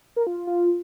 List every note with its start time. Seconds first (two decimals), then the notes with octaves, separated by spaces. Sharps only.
0.16 A#4
0.27 F4
0.37 F4
0.47 F4